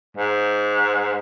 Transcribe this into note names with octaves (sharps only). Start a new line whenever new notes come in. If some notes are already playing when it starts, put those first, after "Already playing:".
G#2